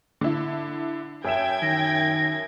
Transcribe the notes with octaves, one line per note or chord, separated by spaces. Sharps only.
D3 E4
F#2 E5 G5 G#6 E7
D#3 A#6